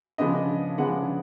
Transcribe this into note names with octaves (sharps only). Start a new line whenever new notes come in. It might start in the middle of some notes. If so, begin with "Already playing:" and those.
C#3 F3 G#3 B3 D4 D#5
C#3 F3 G#3 B3 D4 F#5